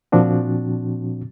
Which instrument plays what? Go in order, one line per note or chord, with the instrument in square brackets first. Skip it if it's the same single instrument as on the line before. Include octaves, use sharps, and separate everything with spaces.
[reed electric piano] A#2 F3 C4 D4 F#4